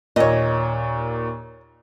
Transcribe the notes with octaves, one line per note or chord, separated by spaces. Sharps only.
D#2 A#2 C#5 D#5